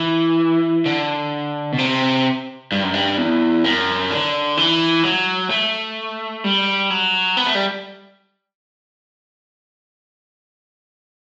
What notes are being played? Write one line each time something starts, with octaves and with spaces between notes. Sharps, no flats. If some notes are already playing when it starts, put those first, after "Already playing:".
Already playing: E3
D3
B2
C3
G2
F#2
G2
E2
F#2
D3
E3
F#3
A3
G3
F#3
B3
A3
G3